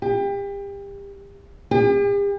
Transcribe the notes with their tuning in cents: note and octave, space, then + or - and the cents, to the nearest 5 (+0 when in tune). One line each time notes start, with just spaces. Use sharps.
G4 +30
G4 +45